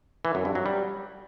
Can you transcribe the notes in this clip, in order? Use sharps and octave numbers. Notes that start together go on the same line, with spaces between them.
E3
F#2
G2
F#3
G3